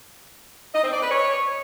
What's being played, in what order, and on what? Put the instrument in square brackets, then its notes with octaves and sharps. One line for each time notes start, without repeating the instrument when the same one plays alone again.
[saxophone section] D#5
C4
D5
B4
C#5